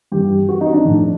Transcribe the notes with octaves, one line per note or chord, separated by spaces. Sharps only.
G2 E3 G4
F#4
D#4
D4
A2 F3